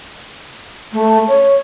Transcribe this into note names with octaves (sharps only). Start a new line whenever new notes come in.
A3
C#5